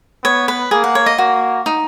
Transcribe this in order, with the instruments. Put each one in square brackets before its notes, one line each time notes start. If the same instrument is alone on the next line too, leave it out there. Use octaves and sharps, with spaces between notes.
[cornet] B3 [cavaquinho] C#5
[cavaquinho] B4
[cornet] A#3 [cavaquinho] G#4
[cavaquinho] F#5
C#5
D#5
[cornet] A#3 [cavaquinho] F#4
[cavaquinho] D#4